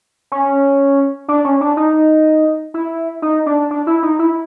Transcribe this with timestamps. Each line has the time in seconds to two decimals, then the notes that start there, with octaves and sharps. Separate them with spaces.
0.32 C#4
1.28 D4
1.45 C#4
1.61 D4
1.77 D#4
2.74 E4
3.22 D#4
3.46 D4
3.71 D4
3.87 E4
4.03 D#4
4.19 E4